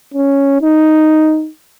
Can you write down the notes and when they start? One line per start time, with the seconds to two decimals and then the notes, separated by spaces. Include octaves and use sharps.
0.14 C#4
0.62 D#4